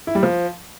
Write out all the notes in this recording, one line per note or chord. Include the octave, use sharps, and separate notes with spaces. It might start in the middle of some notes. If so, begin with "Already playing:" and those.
E4
G3
F3